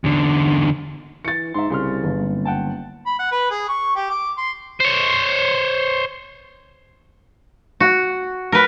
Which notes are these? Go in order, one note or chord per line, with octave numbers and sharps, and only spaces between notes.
E2 D3
E3 A6 C#7
G#2 E5 A#5 C6
C2 C#3 C6 F6
G1
F#1
F#5 G5 A5
B5
F#5
B4
G#4
C#6
G4
D6
C6
C5 C#5
F#4
A#4 B4